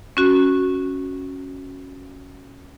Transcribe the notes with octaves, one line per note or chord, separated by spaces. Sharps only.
C#4 F#4